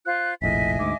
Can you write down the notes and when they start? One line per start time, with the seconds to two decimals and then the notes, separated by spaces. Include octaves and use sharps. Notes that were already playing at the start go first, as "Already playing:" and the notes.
0.06 F4 C5 F#6
0.42 F1 A#1 A2 D#5 E5 G#5 B6
0.79 D2 G#2 D6